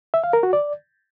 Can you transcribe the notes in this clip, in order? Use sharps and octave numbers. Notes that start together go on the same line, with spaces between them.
E5
F5
A#4
F#4
D5